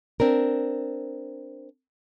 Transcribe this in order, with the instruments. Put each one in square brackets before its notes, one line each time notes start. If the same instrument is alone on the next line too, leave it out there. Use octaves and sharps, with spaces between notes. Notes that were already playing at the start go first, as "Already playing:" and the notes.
[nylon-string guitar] C4 D4 A#4